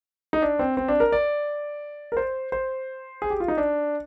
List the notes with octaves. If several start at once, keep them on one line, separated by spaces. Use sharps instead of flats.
D#4
D4
C4
C4
D4
A#4
D5
A#4
C5
C5
G#4
G4
F4
D#4
D4